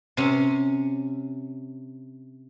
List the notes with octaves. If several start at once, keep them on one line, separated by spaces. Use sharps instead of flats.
C3 C#4